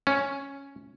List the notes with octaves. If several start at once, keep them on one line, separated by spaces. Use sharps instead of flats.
C#4